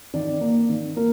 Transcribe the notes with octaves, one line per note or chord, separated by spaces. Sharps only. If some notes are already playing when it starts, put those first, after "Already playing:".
D#3 D5
A#3
D#3
A#3 A#4